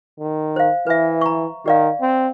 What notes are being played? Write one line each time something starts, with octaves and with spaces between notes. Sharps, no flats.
D#3
C5 F5
E3 B4 E5
A#5 C#6
D#3 G4 D5 F5
C4